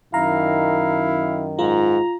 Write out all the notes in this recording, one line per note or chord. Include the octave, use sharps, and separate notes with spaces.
F#2 D#3 E4 F5 A#5
G#2 F4 A#5